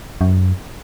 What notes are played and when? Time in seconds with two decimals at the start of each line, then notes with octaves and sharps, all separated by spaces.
0.21 F#2